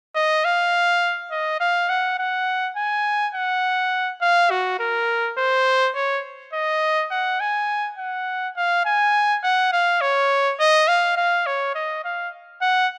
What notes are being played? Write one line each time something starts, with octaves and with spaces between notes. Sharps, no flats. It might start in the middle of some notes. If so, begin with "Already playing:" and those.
D#5
F5
D#5
F5
F#5
F#5
G#5
F#5
F5
F#4
A#4
C5
C#5
D#5
F#5
G#5
F#5
F5
G#5
F#5
F5
C#5
D#5
F5
F5
C#5
D#5
F5
F#5